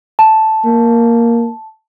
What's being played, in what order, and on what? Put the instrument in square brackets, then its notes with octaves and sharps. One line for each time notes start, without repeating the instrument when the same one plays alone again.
[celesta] A5
[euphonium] A#3